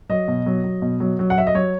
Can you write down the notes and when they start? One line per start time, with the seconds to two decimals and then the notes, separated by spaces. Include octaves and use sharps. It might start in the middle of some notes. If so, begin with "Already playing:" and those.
0.09 F#3 D#5
0.28 B2
0.46 F#3
0.64 F#3
0.82 B2
1.00 F#3
1.19 F#3
1.30 F#5
1.37 F#3 E5
1.47 D#5
1.55 F#3 C#5